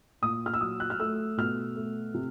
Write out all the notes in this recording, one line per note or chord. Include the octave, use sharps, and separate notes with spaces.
A#2 D#6
F6
E6
F#3 D#6
F#6
F6
A3 E6
B2 F6
A3
C3